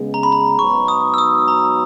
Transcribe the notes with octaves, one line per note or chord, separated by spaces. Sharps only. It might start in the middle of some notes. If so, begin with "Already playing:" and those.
Already playing: C#3 G#3 B3
A#5
B5
A#5
G#2 F#3 B3 C#6
D#6
E6
D#6
A#5